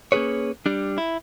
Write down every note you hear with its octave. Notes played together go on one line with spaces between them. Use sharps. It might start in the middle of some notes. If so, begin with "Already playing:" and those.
A#3 C#4 D4 G#4 B4 C#5
G3 D4
E4